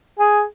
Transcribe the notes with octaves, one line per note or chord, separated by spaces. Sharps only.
G#4